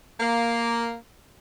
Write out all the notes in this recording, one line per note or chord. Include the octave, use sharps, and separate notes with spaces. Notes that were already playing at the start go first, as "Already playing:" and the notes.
A#3